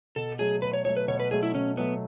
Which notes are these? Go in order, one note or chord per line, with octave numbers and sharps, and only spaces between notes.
B2 A4
F#3 A3 G#4
B2 B4
C#5
F#3 A3 C#5
B4
B2 C#5
B4
F#3 A3 G#4
E4
B2 C#4
F#3 A3 B3